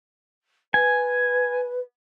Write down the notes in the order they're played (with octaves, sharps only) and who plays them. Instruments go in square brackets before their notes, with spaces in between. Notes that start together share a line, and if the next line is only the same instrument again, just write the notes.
[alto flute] B4 [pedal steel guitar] G#5